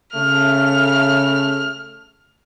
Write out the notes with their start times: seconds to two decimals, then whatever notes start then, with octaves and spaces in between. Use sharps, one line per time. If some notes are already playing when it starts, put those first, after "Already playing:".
0.15 C#3 A3 F6